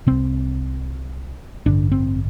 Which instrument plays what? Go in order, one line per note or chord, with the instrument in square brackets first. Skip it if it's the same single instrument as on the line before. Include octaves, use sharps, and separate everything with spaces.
[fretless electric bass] C2 C3 C4
A1 G2 D3 D4
C4